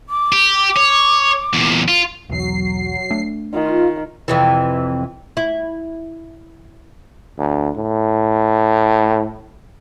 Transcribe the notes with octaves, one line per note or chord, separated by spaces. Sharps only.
D6
G4
C#5
E2 A#2
F4
B1 E2 F#3 C7
A3 D4
D#3 F4
F2 C3 E3
E4
D2
A2